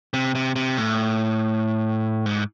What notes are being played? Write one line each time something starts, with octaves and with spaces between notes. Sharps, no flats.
C3
C3
C3
A2
G#2